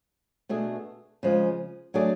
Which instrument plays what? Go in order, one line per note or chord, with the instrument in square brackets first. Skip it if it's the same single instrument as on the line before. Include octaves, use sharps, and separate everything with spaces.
[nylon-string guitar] B2 A3 D4 G#4
C#3 F3 G#3
F#3 A3 D4 G#4 D5